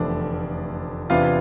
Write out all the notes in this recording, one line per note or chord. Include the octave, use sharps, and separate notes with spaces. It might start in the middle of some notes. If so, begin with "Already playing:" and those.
Already playing: F1 E2 D3 F3 A3 D4 D5
E2 C3 E3 B3 D4 F4 F5